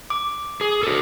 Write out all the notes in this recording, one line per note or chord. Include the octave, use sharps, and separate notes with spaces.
D6
G#4
F#4 A4